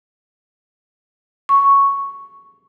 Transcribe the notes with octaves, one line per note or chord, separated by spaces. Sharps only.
C#6